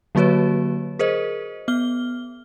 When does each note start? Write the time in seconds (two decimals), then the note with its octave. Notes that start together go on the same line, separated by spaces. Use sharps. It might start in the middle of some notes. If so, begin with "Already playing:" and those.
0.15 D3 F#3 A#3 F#4 B4 C#5
0.99 G#4 A#4 C5 D#5
1.68 B3 F6 G7